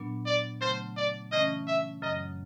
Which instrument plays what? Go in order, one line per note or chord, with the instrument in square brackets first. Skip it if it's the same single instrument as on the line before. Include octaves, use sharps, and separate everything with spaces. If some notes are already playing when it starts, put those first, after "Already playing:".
Already playing: [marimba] A#2 F#3 B3 D4
[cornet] D5
[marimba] C#3 F#3 A3 [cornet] C5
[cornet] D5
[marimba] C#3 E3 A3 C#4 [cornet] D#5
[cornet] E5
[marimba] F#2 C#3 F#3 [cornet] D#5